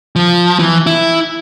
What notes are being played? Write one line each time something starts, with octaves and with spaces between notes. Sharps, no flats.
F3
E3
E4